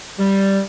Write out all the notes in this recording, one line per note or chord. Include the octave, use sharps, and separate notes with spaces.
G3